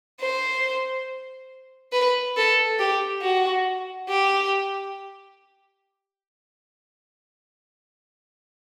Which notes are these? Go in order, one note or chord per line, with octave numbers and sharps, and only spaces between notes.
C5
B4
A4
G4
F#4
G4